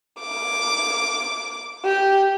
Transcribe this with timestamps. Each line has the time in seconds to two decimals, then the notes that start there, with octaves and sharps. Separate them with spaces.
0.20 D6
1.85 G4